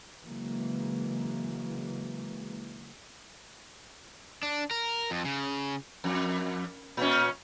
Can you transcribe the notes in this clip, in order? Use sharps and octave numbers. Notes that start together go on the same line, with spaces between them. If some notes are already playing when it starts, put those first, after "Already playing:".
C#3 E3 F#3 G#3 A#3
D4
A#4
F2
C#3
F2
A#2 C#4